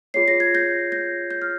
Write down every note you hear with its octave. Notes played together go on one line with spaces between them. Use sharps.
F4 G#4 C#5 C7
A#6
G#6
G6 A#6
G6 A#6
G6
F6